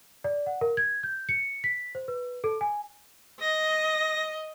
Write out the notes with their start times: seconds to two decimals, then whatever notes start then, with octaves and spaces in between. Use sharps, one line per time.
0.24 D5
0.46 F#5
0.61 A#4
0.77 G#6
1.03 G6
1.29 C#7
1.64 B6
1.95 C5
2.08 B4
2.44 A4
2.61 G#5
3.41 D#5 A#6